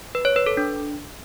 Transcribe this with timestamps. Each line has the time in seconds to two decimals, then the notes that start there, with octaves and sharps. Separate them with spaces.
0.15 B4
0.25 C#5
0.36 B4
0.46 A4
0.57 D4